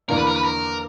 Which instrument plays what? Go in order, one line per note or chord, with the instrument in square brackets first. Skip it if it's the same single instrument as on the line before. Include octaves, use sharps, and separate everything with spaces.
[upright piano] E2 D3 A#3 D4 [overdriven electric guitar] A#4
[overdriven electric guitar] B4
A#4
B4
A#4